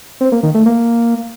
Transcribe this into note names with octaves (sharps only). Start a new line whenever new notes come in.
C4
A#3
D#3
A3
A#3